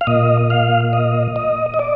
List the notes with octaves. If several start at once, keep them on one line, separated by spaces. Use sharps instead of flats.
F5
A#2 D#5
F5
D#5
D#5
D#5
D5